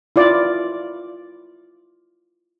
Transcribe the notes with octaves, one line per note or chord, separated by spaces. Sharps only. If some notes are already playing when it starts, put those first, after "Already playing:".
E4 F4 D5